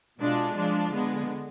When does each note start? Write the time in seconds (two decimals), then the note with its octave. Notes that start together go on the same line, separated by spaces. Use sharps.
0.18 B2 G#3 D4 F4
0.54 F3 G#3 D4 F4
0.91 D3 G#3 B3